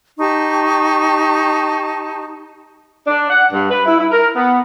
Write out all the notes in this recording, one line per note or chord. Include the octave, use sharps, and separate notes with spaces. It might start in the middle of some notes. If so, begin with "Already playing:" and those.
D#4 G4 A5 C#6
D4
F#5
G2
B4
E4
E4
A#4
B3